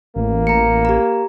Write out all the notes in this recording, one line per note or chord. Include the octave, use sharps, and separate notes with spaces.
A1 A#3
A#5 C#7
G4 A#5